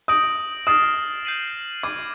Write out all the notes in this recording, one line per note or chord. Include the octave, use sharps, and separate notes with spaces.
D#6 G6 A#6 D7 F#7
D#6 F6 A6 C7 E7
G6 C7 D#7 F#7
D6 G#6 C7 D#7 F#7